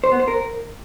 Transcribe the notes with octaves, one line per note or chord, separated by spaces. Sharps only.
C5
B3
C5
A#4